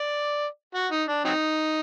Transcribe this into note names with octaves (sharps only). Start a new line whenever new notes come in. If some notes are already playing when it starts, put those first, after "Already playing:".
Already playing: D5
F#4
D#4
D4
F#3 C4 D#4